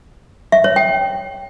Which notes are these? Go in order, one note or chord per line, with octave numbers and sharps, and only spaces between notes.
E5
C#5
G5